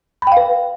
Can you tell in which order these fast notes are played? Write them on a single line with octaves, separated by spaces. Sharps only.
B5 G5 F5 B4